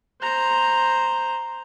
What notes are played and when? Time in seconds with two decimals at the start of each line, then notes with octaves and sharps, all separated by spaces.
0.22 C5 A#5